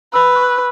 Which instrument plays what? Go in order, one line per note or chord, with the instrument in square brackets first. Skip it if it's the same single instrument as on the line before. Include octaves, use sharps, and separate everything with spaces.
[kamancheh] B4 [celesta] B5 E6
[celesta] C#6 F#6